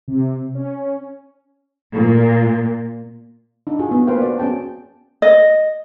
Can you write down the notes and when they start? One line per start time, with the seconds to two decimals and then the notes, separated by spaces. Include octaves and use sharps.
0.08 C3
0.55 C#4
1.93 A#2
3.67 D4 D#4
3.79 F4 F#4 G#4
3.91 B3 F#4
4.07 A#3 B4 C5 F5 G5
4.22 F#4 D5
4.38 B3 C#4 G#4 G5 A5
5.22 D#5